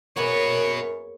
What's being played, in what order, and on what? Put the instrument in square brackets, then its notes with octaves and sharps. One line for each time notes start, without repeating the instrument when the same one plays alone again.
[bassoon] F#2 [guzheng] A#3 B3 G#4 [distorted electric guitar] F#4 B4 [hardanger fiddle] C#5